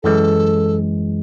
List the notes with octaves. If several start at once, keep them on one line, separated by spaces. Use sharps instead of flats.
F#2 E3 G#3 A4